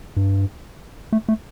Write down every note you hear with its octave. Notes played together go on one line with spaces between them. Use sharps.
G2
A3
A3